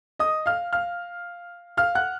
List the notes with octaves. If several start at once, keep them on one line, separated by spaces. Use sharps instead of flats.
D#5 D#6
F5 F6
F5 F6
F5 F6
F#5 F#6